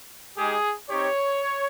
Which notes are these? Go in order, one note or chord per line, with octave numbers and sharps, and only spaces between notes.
G#3 D#4 G4 G#4
C4 D#4 G4 C#5